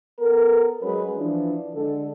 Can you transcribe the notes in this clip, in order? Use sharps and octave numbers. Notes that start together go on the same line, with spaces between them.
B3 A4 A#4
F#3 G#3 C#4 G#4 B4
E3 F3 D4
D3 G#3 D4 A4